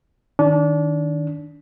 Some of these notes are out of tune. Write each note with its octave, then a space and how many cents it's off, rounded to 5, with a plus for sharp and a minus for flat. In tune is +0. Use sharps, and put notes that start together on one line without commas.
D#3 +0 D4 -25